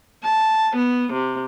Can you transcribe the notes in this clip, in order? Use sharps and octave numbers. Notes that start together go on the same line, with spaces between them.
A5
B3
C3